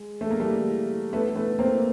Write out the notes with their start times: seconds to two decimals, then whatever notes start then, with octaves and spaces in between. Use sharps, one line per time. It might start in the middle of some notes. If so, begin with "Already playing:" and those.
Already playing: G#3
0.21 A3
0.31 A#3
0.40 G3 A3
1.13 A3 B3
1.36 A3 B3
1.59 A#3 C4